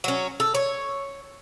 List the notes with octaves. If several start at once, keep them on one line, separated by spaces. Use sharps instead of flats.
F#3 C#4
A4
C#5